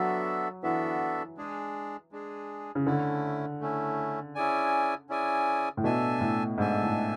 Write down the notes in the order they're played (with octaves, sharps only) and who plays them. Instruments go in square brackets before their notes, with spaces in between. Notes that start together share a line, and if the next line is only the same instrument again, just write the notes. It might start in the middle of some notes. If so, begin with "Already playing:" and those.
Already playing: [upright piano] F#3 [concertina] B3 D4 F#4 A4 E5
[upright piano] E3 [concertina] B3 D4 F#4 A4 E5
[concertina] G#3 D4 G#4
G#3 D4 G#4
[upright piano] C#3
[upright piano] D3 [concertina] A3 C#4 E4
[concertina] A3 C#4 E4
C#4 E4 G#4 D5 G#5
C#4 E4 G#4 D5 G#5
[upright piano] A2
[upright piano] B2 [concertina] D4 A4 E5 G#5
[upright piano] A2
[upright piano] G#2 [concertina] D4 A4 E5 G#5
[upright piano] A2